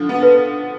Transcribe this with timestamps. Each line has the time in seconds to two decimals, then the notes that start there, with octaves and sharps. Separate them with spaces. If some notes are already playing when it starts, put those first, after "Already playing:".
Already playing: D3 F3
0.09 B3
0.23 B4